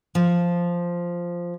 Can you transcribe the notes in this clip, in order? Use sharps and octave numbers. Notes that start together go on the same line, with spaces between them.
F3